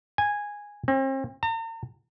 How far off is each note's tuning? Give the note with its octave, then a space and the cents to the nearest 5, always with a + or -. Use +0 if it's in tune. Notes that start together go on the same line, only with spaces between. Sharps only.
G#5 -10
C4 +40
A#5 -45